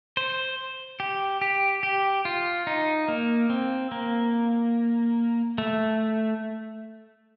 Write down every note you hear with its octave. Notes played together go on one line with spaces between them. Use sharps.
C5
G4
G4
G4
F4
D#4
A#3
C4
A#3
A3